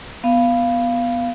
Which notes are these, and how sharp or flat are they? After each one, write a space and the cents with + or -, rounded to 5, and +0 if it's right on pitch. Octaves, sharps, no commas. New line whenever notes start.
B3 +0 F5 -10